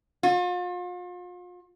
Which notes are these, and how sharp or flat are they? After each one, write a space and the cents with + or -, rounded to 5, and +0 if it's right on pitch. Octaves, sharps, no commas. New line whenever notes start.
F4 +40